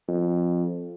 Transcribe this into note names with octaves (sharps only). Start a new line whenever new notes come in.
F2